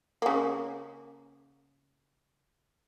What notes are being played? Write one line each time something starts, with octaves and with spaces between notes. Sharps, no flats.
C#3 A#3